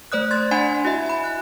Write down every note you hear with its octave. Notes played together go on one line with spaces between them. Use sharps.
A3 C5 D5 D#6 F#6
C6 G#6 A6
D4 F#5 G#5 B5 C6
E4 F#4 D#5 E5
G#5 B5
F#6